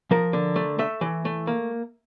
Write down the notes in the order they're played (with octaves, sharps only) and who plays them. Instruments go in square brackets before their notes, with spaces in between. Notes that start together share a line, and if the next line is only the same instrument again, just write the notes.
[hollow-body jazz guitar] F3 A#4
D3
A3
A3 E5
E3
A3
A#3